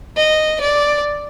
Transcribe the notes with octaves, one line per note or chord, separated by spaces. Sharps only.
D#5
D5